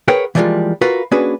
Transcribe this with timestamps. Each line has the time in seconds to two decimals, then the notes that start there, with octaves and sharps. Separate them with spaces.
0.08 G#4 A#4 B4 C#5 F#5 G5
0.35 E3 F3 G3 G#3 A#3 F4
0.81 F4 F#4 A#4 B4 E5 F5
1.11 A#3 C#4 D4 F#4 G#4 B4